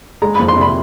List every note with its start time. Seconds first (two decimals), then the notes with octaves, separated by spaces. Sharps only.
0.22 G#3 A#5
0.35 B5
0.39 F2
0.48 C6
0.57 C3 B5